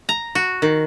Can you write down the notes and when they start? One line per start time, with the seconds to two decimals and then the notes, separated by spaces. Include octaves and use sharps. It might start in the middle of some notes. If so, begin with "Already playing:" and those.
0.09 A#5
0.35 F#4
0.62 D#3